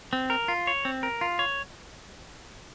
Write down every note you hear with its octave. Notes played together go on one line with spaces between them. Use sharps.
C4
A#4
F4
C#5
C4
A#4
F4
C#5